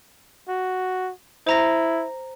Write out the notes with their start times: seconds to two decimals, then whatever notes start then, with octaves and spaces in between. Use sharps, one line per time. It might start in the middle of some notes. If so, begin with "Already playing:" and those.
0.48 F#4
1.47 E4 C5 A#5 A#6